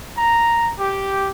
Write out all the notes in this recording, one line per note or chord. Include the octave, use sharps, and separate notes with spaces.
A#5
G4